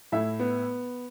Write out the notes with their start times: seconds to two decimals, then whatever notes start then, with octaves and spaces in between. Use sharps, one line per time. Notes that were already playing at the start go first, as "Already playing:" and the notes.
0.12 A2 E4 E5
0.39 B3